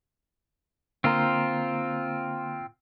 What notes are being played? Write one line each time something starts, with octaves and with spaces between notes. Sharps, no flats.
D3 A#3 C4 F4 A#5